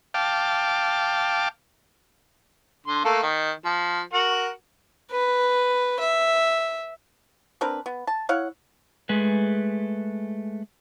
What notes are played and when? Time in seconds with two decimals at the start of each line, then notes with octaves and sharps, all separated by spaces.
0.14 F5 G5 A5 D6
2.87 D3 C6
3.05 A3 A#3 A4
3.23 D#3
3.65 F3
4.13 F#4 A#4 F#5
5.11 B4
5.99 E5
7.61 C4 D4 A#4 B4
7.86 B3
8.07 A5
8.29 E4 C#5 F5 F#5
9.09 G#3 A3 G#4 B4